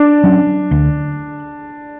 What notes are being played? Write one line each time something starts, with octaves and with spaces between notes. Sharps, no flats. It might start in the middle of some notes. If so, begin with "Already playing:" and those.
Already playing: D4
F#3 C#4
D2